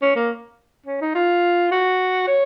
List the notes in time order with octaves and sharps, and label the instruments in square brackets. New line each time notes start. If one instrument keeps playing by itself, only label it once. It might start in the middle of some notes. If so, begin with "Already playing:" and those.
[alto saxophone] C#4
A#3
C#4
D#4
F4
F#4
C#5